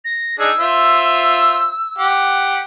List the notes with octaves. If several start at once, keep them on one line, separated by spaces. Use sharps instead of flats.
A#6
D4 D#4 G#4 E6
F4 C5 E5
G4 F#5